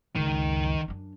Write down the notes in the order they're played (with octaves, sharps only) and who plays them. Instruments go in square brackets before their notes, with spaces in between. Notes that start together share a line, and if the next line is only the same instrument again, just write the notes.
[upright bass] C#2 F#2 [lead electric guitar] D#3
[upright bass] F#2 D4